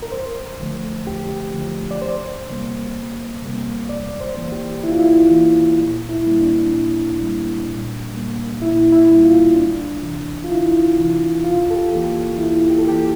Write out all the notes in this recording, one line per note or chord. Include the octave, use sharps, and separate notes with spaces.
A#4
F2 C5
D3 F3 A3
F2 G4
D3 F3 A3
D5
C2 C5
C3 G3 A#3
C2
C3 G3 A#3
F2 D5
C5
E3 A#3
G4
F2 E4
F4
E4
E3 A#3
A#2
E4
G3 A#3
D4
A#2
G3 A#3
A#2
G3 A#3
A#2 E4
E4
G3 A#3
F4
D2 D4
C3 E3
F4
D2 E4
C3 E3
E2 F4
A4
G4
E3 A#3
E2 E4
G4
A4
E3 A#3 G4